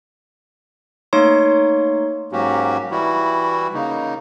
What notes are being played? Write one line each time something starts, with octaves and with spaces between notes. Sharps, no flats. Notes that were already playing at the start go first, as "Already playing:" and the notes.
A3 A#3 D#4 C#5 C6
G#2 F#3 A#3 C#4 F#4 G4
E3 G3 E4 F#4
C#3 A#3 D#4